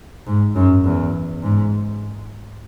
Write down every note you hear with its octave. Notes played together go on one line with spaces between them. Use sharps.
G#2
F#2
E2
G#2